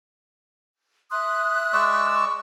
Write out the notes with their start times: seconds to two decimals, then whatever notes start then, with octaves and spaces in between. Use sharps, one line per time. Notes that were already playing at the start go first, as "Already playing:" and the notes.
1.11 E5 C6 D#6 F#6
1.73 G#3 D5 C#6 E6
2.15 C#6